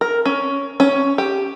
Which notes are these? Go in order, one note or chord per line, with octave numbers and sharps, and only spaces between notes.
A#4
C#4
C#4
G4